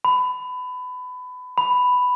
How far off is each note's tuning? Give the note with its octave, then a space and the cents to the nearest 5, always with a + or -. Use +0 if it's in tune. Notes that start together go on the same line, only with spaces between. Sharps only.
B5 +25
B5 +5